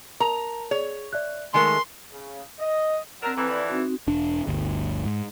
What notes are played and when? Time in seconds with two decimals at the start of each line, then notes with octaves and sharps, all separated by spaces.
0.20 A#4 A5 A#5 F7
0.71 G#4 C#5
1.13 D5 E5 F#6
1.54 D#3 G#3 A3 A#4 G#5 C6
2.11 C#3
2.59 D#5
3.22 F#3 C4 D4 A#4 A#5 E6
3.37 F2 D3 E3 B4 B5
3.51 D5
3.70 C4 D#4 F#4
4.07 E1 D4
4.47 G1 D2
5.05 G#2